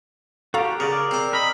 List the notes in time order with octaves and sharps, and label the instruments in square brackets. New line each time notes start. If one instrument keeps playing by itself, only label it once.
[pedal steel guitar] F#4 G4 [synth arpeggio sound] A4 F5 A#5
[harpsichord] C#3 [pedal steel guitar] A#4 D5
[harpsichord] C4 C5
[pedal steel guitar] A#4 D#5 [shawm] B5